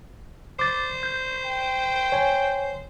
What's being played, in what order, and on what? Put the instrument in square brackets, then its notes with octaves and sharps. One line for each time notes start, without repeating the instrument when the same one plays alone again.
[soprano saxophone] C5 [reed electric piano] D6 A6
[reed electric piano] G6
[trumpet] G5
[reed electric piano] C#5 G#5